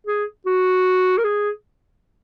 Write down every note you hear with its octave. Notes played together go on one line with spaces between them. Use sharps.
G#4
F#4
A#4
G#4